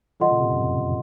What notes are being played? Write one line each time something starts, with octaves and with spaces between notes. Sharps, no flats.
D#3 F#3 F4 A4 D#5 F#5 C6
A#2 C#3
A2 C3
F#2
F2